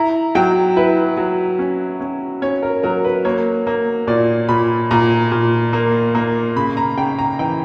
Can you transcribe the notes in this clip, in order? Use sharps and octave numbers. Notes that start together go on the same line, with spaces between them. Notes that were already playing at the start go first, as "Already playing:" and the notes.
Already playing: E4 A#5
F#3 G5
E4 B4
F#3
C#4
C#4
C#4 C#5
A#4
F#3 A#4
B4
A#3 C#5
A#3
A#2 D5
A#2 B5
A#2 A#5
A#2
A#3
A#3
C#3 B5
A#5
C#3 G5
A#5
E3 G5